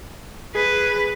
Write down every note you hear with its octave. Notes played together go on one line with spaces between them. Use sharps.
G#4 B4